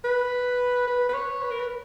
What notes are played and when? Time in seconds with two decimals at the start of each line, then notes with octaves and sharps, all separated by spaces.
0.05 B4
0.87 B4
1.09 B4
1.14 C#5
1.42 B4
1.51 A#4
1.60 B4